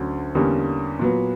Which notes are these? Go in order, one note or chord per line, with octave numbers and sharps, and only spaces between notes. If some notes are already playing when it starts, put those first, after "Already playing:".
Already playing: D2 D3 F#3 C#4
E2 D3 G3 A#3 C#4
A#2 F#3 B3